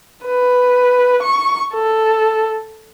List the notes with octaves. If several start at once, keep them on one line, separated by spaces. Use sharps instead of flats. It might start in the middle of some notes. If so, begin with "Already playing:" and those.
B4
C#6
A4